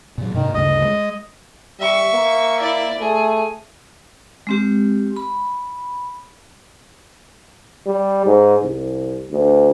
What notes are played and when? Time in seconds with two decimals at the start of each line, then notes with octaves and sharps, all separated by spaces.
0.18 A#2 F#3
0.34 G#2 C3 D#3 A#3
0.54 D2 G2 C#3 D#5
0.85 G#3
1.80 G3 E5 C#6
2.13 A#3
2.59 E4 D5
3.00 A3 G#4
4.47 G#3 C4 G4
5.16 B5
7.86 G3
8.26 G#2
8.62 C2
9.30 D2